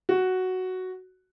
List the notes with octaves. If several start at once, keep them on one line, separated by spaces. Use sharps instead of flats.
F#4